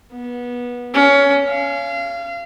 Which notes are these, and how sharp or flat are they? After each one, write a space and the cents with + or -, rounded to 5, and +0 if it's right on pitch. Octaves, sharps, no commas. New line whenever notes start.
B3 -20
C#4 +20
F5 -30